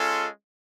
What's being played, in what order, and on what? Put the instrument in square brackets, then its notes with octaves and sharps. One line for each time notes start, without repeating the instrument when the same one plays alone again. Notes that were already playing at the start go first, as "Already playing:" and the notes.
Already playing: [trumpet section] G#3 C#4 F4 A4